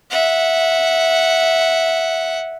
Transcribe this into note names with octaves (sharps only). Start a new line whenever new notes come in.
E5 F#5